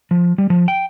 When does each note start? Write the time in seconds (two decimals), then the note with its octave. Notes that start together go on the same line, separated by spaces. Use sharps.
0.11 F3
0.38 G3
0.50 F3
0.68 G5